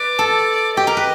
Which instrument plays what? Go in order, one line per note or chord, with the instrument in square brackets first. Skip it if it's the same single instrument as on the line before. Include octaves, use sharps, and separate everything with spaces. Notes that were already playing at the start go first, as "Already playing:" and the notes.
Already playing: [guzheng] B4 [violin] D5
[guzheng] A4
[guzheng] G4 [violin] D#5
[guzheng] A#4
B4